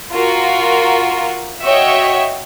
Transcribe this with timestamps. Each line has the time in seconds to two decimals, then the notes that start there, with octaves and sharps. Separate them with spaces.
0.11 F4 F#4 A#4
1.63 F#4 C#5 D#5 E5 G5